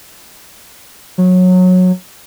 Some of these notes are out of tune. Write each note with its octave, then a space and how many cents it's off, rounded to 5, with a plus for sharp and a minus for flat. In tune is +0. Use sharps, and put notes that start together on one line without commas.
F#3 -20